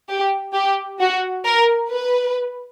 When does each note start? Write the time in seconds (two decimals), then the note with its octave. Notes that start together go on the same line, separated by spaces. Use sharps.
0.09 G4
0.53 G4
0.99 F#4
1.45 A#4
1.91 B4